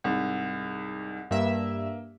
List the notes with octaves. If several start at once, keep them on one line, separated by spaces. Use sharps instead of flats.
C2 G#2
G2 A#3 E5